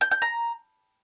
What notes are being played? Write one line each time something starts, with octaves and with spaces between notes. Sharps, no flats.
G6
G6
A#5